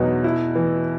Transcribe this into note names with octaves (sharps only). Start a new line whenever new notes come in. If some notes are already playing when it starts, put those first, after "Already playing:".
Already playing: E2 B2 F#3 D#4
E4
E3